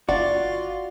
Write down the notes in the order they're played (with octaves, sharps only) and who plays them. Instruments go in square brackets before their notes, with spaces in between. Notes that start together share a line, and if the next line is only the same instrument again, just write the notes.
[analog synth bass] G1 [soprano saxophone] F4 [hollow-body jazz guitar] F#4 [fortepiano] D5